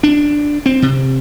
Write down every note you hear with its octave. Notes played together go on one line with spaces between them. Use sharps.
D4
C4
C3